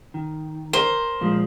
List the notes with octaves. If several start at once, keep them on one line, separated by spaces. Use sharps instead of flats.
D#3
A#4 C5
A#2 F3 G#3